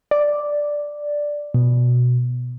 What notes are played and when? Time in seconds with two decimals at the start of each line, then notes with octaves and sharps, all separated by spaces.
0.11 D5
1.54 B2